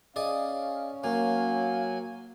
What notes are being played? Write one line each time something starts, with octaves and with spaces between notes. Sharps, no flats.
C#4 G#4 D5 D#5 F5
F#3 A#3 F5 G#5